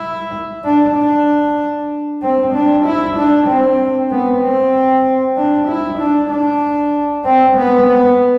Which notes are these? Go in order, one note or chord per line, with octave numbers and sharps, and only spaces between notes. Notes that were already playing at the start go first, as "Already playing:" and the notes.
Already playing: E4
D4
D4
C4
D4
E4
D4
C4
B3
C4
D4
E4
D4
D4
C4
B3
B3